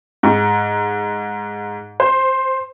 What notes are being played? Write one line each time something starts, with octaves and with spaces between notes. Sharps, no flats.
G#2
C5